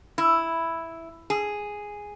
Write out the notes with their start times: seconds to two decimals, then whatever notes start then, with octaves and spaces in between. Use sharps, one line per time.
0.18 E4
1.30 G#4